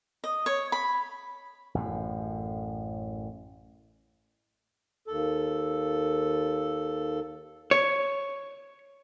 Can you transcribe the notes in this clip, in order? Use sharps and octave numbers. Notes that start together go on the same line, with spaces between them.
D#5
C#5
B5
A1 F#2 A2
D#2 A4
C#5